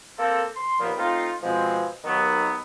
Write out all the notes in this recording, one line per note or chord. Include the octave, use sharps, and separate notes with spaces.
A#3 C4 A4
C6
D#2 A#2 F3 A#3 B3
A3 C4 D#4 F4
B2 F3 G#3 C4
D#2 D#3 F#3 B3